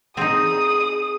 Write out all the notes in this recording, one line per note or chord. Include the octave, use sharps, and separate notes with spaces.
C4 D#4 G#4 D#6